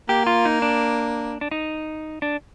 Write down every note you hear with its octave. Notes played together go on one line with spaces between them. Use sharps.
A#3 G4
F4
D#4
D4
D4
D#4
D4